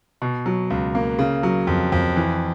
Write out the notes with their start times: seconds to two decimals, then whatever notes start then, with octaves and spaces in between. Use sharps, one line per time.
0.22 B2
0.46 F#3
0.70 C#2
0.95 A#3
1.19 C#3
1.43 F#3
1.67 F2
1.92 F2
2.16 E3